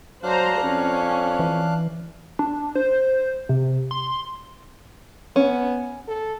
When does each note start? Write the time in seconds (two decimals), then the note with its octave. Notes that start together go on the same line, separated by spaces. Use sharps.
0.23 F#3 D4 C5 F5 A#5 F#6
0.63 F2 C#4
1.39 E3
2.39 D4
2.75 C5
3.49 C3
3.91 C6
5.36 B3 C#4
6.08 A4